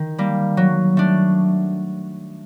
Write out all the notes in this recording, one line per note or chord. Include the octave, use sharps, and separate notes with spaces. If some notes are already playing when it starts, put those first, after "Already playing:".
Already playing: D#3
G3 A#3
F#3
A3 D4